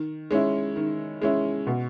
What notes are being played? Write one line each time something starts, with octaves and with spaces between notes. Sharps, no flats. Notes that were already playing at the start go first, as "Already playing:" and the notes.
Already playing: D#3
G#3 C#4 E4
D#3
G#3 C#4 E4
B2